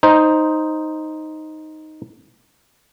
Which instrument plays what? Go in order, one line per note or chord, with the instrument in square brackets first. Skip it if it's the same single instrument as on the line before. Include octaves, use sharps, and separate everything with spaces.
[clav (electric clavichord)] D#4 C5